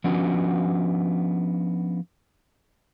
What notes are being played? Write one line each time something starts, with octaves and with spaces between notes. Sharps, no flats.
F3 B3 C#4 D4 F#4